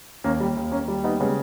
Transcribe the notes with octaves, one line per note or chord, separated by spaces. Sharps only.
D#2 A#3 C#4
G3
D#2
A#3 C#4
G3
B3 D#4
C#3 G#3 B3